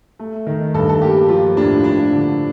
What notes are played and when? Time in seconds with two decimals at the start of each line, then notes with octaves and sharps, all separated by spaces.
0.19 A3
0.47 D#3
0.74 G2 A4
0.89 A4
1.02 A#3 G4
1.29 F3 F4
1.57 A2 D4
1.84 F3 D4
2.13 D3